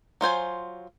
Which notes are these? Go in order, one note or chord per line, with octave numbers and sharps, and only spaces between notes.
F#3 F4 C5 G#5